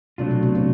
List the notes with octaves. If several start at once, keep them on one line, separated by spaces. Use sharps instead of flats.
C3 F#3 A3 D4 F4
B2
C3
C3